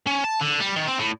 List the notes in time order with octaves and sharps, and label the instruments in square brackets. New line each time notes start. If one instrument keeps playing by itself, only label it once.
[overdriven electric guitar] C#4
A5
D3
G3
D#3
C4
A2